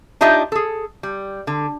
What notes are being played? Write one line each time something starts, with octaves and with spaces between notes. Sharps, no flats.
D4 D#4 F4 G4 D#5 E5
G#4 A4
G3
D3